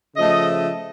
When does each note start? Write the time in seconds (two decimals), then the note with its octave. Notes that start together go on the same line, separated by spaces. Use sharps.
0.16 C#3 F3 A3 D#5